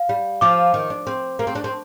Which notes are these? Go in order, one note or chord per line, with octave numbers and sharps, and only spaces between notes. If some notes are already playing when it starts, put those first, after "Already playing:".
Already playing: F5
G3
F3 D6
D#3
D4
C4
A#3
C4
D4
C4